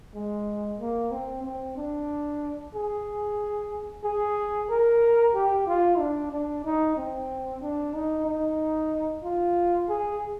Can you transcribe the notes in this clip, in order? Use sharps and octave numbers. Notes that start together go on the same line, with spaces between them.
G#3
A#3
C4
C4
D4
G#4
G#4
A#4
G4
F4
D4
D4
D#4
C4
D4
D#4
D#4
F4
G#4